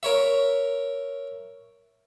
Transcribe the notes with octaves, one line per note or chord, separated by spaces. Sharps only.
A#4 C#5 E5